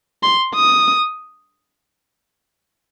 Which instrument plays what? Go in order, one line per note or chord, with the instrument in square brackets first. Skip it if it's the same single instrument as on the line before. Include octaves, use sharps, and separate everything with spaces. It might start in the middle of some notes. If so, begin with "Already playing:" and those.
[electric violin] C6
D#6